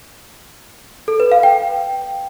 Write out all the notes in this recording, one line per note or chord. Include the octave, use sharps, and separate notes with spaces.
A4
B4
F5
G5